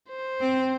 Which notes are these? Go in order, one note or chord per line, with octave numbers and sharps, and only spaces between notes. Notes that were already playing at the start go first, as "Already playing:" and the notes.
C5
C4